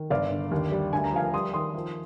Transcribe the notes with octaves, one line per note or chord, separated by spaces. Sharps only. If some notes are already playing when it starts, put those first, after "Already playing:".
Already playing: D#3
G1 D5 F5
D3
D#2
G3
D2 G#5
A#5
F3 F5 G#5
G3 C6 D#6
D#3 C6 D#6
F3